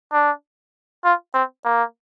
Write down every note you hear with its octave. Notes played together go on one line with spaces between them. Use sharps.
D4
F4
C4
A#3